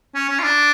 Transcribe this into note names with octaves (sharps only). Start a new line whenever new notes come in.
C#4
C#4
F4
D4